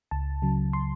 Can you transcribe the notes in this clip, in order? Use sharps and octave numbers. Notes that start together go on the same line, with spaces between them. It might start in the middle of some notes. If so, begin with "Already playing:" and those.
C#2 A5
C#3 F#3
C6